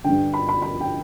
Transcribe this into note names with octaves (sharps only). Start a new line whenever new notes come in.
G2 D3 G5
B5
B5
B5
G5